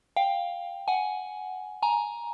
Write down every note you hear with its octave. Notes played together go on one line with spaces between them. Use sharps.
F5 G5
F#5 G#5
G#5 A#5